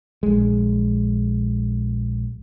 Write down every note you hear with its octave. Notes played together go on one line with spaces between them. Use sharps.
A#1 G#3